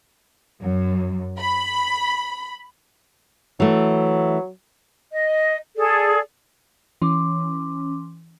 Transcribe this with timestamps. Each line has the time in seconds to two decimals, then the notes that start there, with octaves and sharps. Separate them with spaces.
0.61 F#2
1.40 B5
3.60 E3 F#3 A3
5.11 D#5
5.76 G#4 A4 D5
7.02 E3 C#4 C6 D6